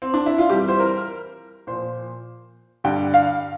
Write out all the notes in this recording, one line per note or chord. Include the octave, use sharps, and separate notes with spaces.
C4
D4
E4
F4
F2 E3 G3 G4
C5
A#4
A#2 F3 C5
G2 D3 G3 G5
F5